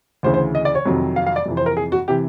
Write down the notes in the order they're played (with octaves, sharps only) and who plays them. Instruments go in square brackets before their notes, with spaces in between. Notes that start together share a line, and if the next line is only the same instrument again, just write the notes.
[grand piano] D2 C#3 E3 C5
C5
D#5
D5
C#5
F2 C3 D#3 F#3
F5
F5
D5
F2 C3 E3
C5
A#4
G#4
F#4
C3 E3 G4